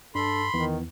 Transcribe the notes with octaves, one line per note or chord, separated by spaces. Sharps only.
G2 D4 A4 B5 C6
E2 D#3 E3 B3